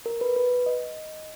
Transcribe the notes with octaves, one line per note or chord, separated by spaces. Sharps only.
A#4
B4
B4
D#5